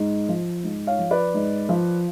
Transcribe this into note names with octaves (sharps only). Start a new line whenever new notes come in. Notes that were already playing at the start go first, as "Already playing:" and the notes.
Already playing: G#2
F3
G#2
C#5 F5
F3
B4 D5
G#2
F3